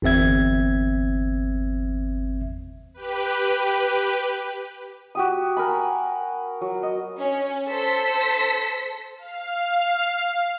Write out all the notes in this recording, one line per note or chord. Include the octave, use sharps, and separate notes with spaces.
G1 E2 C4 E5 G#6
G4 B4
F#4 G4 D#6
A#4 G#5 B5
F#3
D#5
C#4
A4 C5 B6
F5